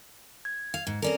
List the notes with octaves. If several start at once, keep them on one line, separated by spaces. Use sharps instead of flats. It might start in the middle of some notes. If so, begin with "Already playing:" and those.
G#6
F5
G#2
C4 C#4 A4 A#4 D5